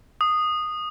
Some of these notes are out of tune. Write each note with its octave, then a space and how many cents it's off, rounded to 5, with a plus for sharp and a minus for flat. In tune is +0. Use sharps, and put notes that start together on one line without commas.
D#6 -10